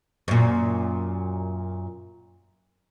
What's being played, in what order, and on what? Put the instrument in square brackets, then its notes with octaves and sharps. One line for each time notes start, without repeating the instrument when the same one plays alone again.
[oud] F#2 A#2